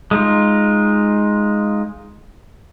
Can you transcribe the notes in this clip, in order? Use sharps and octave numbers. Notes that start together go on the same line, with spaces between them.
G#3 D#4 F4